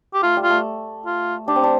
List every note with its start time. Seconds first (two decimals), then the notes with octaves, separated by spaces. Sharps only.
0.14 G4
0.23 A3 F4
0.37 G3
0.43 F4
0.50 A3
1.06 F4
1.48 D4 G4
1.56 C4
1.64 D4